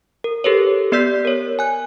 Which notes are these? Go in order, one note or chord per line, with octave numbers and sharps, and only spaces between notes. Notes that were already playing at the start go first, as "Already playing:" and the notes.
A#4
G4 A4 B4 C#5
B3 G4 D5 E6 G6 B6
A#4 C#5
G#5 F#6